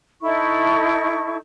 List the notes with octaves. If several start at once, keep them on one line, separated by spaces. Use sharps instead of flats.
D#4 E4 A4 C#6